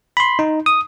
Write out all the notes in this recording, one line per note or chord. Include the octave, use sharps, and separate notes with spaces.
B5 C6
D#4
D#6